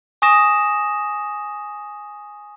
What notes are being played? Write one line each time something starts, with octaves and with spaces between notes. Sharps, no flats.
G#5 C#6 D#6 A#6 E7